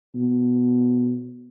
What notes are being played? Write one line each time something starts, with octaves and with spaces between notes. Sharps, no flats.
B2